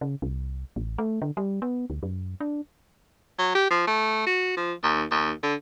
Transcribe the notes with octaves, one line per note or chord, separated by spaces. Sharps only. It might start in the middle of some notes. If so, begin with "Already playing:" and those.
C#3
C2
A1
A3
D3
G3
B3
D2
F#2
D4
F#3
G4
F3
A3
F#4
F3
D#2
D#2
D3